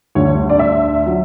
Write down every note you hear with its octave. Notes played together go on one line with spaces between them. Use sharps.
D2 D3 G3 C#5
D5
E5
F#3